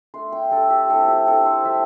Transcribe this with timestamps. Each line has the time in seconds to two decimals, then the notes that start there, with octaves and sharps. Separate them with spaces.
0.14 A3 D4 C6
0.32 G5
0.51 G3 D4 A4
0.70 G4
0.90 G3 C4 E4 A4
1.08 G4
1.27 G3 D4 A4
1.46 C5
1.64 G3 D4 E5